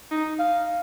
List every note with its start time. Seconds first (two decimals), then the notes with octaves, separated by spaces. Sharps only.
0.11 D#4
0.39 F5